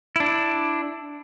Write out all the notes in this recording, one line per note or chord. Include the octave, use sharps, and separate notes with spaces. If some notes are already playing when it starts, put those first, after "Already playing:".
D4 E4